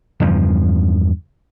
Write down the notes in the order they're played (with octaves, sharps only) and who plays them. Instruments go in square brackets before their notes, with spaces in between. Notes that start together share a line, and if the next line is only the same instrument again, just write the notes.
[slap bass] E2 G2 C#3 F3